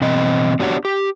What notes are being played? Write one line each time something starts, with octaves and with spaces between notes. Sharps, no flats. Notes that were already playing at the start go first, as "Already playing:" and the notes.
B2 E3 C4 D#5
B3 D4 F#4 G4 C#5 F#5
G4